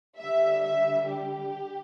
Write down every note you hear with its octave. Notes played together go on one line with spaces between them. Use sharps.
D3 G3 E5
E5
G4